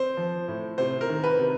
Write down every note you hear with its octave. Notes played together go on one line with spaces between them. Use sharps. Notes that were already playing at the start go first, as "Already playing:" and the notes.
Already playing: C4 C5
F3
A2
C3 C5
A#4
D#3
B4
C3